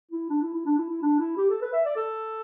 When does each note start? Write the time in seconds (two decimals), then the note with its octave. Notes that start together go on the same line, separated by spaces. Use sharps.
0.11 E4
0.30 D4
0.42 E4
0.54 E4
0.66 D4
0.78 E4
0.89 E4
1.02 D4
1.19 E4
1.37 G4
1.50 A4
1.62 B4
1.73 E5
1.85 D5
1.96 A4